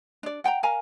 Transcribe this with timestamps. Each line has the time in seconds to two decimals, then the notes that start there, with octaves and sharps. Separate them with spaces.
0.23 D4 D5
0.44 F#5 G5 A5 A#5
0.63 A#4 F5 G#5 A#5